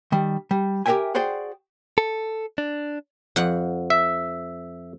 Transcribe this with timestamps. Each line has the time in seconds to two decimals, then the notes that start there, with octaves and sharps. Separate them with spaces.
0.12 D#3 G3
0.51 G3
0.86 G4 A#4 B4 E5 G5 G#5
1.15 F#4 G#4 C5 D5 G5
1.98 A4
2.58 D4
3.36 F2 F#5
3.90 E5